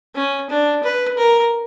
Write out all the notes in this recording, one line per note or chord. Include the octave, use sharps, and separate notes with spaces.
C#4
D4
B4
A#4